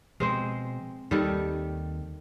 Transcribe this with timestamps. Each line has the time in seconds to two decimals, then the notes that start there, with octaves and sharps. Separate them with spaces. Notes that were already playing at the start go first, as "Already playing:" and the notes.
0.20 B2 F3 G#3 C4 C5
1.11 D#2 D#3 G3 A4